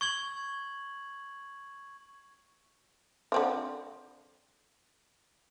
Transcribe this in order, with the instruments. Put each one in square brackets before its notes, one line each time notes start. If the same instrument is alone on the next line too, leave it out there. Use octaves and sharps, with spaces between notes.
[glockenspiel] C#6 G#6 F#7
[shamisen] D3 C4 F4